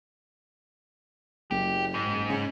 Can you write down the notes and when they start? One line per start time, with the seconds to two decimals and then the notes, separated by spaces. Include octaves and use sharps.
1.51 F#1 G4
1.94 G#2
2.29 C#3